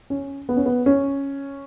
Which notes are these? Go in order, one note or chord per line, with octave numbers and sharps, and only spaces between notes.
C#4
B3
C#4
B3
C#4